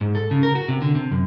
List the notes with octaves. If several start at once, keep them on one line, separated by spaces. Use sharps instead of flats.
G#2
A4
C#3
A#4
F#4
C3
D3
C3
F#2